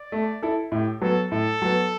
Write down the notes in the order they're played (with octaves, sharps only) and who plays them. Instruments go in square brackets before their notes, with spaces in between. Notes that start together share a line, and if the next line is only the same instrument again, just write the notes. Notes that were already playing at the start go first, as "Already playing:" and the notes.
Already playing: [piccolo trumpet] D5
[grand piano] A3
E4 A4
[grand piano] A2 [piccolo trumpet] G4
[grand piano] F#3 B3 [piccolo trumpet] A4
[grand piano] A2 [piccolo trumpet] A4
[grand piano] F#3 B3